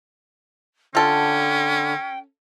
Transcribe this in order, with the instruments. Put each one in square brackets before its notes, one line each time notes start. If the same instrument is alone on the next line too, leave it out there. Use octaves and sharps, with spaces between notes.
[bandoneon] D3 [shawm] C#4 [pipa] F4 A4 [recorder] G5